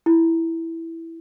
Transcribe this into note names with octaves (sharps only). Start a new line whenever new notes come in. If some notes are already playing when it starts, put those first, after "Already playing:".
E4